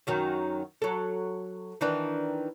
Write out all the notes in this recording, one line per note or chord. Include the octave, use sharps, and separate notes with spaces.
F#2 D#3 F#3
F#3 A4
D#3 E3 D4